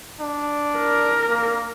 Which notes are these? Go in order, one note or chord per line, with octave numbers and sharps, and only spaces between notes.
D4
A#4
A#3